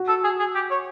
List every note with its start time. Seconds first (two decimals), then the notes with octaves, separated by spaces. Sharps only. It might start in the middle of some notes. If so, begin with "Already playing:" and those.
Already playing: F#4
0.08 A4
0.24 G#4
0.39 G#4
0.55 G4
0.70 C#5